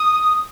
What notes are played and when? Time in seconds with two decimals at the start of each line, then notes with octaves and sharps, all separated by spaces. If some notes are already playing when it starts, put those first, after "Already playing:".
Already playing: D#6